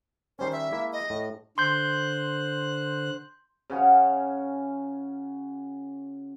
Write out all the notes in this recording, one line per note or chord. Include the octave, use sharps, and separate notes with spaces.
D#3 G3 C#4 C5
E5
G#3 A#3 E4
D#5
A2
D3 C5 C6 F#6 G6
C#3 C#4 F#4 C#5